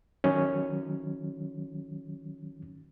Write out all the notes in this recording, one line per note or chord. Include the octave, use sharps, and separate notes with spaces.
D#3 F#3 C#4